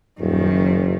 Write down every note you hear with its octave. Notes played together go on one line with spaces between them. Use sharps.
D#1 F#2 D#3
F#1